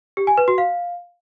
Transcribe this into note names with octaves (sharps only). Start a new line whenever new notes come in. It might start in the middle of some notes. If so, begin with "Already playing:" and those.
G4
G#5
B4
F#4
F5